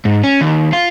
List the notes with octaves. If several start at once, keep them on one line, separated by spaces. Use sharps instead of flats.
G#2
C#4
D#2
F4